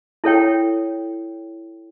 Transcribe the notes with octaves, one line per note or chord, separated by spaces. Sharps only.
E4 A4 C#5 G5